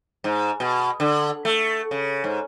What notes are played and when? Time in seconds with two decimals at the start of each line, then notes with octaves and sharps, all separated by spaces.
0.24 G#2
0.60 B2
1.00 D3
1.45 A3
1.91 C#3
2.24 G#2